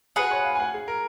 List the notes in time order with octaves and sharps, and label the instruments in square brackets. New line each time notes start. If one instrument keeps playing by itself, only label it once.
[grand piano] F#4 [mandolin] G#4 B4 F#5
[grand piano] C#5
F5
G#5
F#5
G#4
A#4